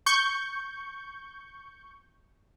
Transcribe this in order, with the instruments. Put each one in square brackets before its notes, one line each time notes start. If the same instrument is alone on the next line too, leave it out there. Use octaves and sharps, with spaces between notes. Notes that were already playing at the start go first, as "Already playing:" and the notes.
[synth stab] C#6 G6